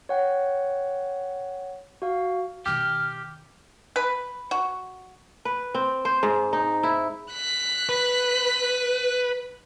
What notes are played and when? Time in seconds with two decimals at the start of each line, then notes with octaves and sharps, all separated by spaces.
0.09 C#5 F#5 G5
2.02 F#4 F5
2.66 B2 D#3 G4 F6
3.96 B4
4.51 F#4
5.45 B4
5.75 C4
6.05 C5
6.23 G#2
6.53 D#4
6.83 E4
7.33 F#6 B6
7.89 B4